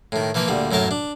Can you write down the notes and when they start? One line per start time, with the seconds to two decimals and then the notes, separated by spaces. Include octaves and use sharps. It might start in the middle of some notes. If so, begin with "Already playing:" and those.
0.12 A2 D#3
0.35 E3 F3 A#3 B4
0.48 D2 A#2 G3
0.71 F#2 A2 A3 A#4 A5
0.91 D4